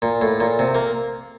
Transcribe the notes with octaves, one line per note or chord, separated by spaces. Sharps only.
A#2
A2
A#2
C3
A#3